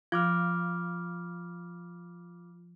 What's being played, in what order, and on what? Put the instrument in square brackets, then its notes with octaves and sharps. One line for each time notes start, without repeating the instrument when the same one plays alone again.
[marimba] F3 [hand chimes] F4 D6 F6